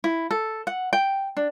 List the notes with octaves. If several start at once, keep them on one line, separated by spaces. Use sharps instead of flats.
E4
A4
F#5
G5
D4